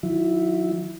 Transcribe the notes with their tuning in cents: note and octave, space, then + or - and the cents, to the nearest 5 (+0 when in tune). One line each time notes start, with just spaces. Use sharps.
D#3 +0 F#3 -35 E4 +0